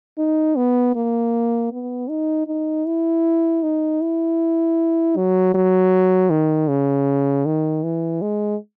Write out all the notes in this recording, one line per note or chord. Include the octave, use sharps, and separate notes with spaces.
D#4
B3
A#3
B3
D#4
D#4
E4
D#4
E4
F#3
F#3
D#3
C#3
D#3
E3
G#3